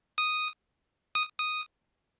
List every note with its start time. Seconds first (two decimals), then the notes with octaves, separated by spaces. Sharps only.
0.18 D#6
1.15 D#6
1.39 D#6